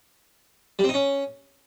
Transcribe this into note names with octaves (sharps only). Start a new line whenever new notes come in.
G3
C4
D#4
C#4